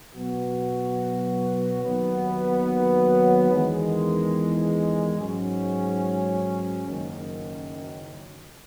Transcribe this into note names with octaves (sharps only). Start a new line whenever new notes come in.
B2 F#3 B3 F#4
D#2 D#3 F#3 B3
E2 D#3 G#3
G#2 F#3 C#4
F#1 F#2 D#3